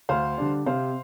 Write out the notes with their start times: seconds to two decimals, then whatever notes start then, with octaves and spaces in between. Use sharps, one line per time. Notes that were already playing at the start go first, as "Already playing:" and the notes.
0.09 D2 C5 F5
0.38 D3 G3 D4
0.66 C3 C5 F5